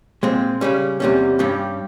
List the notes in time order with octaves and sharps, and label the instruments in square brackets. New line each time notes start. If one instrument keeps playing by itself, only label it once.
[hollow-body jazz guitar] A#2 G#3 C4
C#3 G3 C#4
E2 C3 G3 C#4
G2 G3 C#4 G4